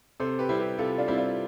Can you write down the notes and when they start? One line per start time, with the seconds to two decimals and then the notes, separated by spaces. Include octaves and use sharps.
0.20 C3 A4 C5
0.39 G4 B4
0.49 G3 C4 E4
0.59 G4 B4
0.78 C3 F4 A4
0.98 D4 F4
1.08 G3 C4 E4
1.17 D4 F4